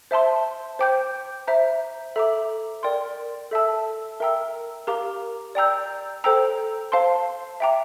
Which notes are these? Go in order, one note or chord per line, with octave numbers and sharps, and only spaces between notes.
C5 E5 A5 C6
C5 G5 D6 G6
C5 E5 A#5
A4 E5 A#5 D6
A#4 D5 G5 C6
A4 E5 A5 E6
A#4 E5 G5 A#5 E6
G4 A#4 F5 A#5 D6
D5 G5 A#5 E6 G6
A4 C5 G5 A#5 E6
C5 F5 A5 C6
E5 G5 A#5 D6